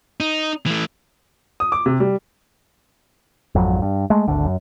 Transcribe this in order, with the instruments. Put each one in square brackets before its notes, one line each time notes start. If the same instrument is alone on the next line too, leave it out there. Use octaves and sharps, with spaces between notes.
[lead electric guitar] D#4
E3 A3
[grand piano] D#6
D6
C3
G3
[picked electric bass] G#1 F2 F#3
G2
G#3 A3
G#1 D2 D3
F#2